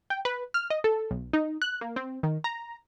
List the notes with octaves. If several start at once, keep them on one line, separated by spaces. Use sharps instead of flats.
G5
B4
F6
D#5
A4
B1
D#4
F#6
A#3
C4
D#3
A#5